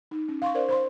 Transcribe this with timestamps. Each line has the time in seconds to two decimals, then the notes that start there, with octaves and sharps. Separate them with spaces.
0.11 D#4
0.29 C#4
0.42 F5 C6 C#6
0.55 A#4 C5 D5
0.69 C5 B5 C6